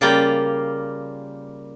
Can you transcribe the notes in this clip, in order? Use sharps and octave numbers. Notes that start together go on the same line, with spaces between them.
C#3 G3 A#3 F4 D5 G5